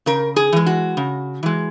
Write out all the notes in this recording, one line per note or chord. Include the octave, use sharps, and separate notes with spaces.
C#3 A#4
G#4
E3 G#3
F#4
C#3
E3 G#3